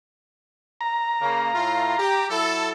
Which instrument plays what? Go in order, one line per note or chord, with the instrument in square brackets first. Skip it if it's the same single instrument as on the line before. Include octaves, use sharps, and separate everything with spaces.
[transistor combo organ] A#5
[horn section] C#3 A#3
A2 F4
G4
F#3 E4 A4